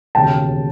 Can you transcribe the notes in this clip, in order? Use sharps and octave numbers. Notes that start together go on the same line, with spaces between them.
E1 D#2 C#3 G5 A5